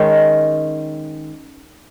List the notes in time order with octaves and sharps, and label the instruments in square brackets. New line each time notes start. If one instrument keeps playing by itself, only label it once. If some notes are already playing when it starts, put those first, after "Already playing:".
Already playing: [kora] D#3 G#3 C#4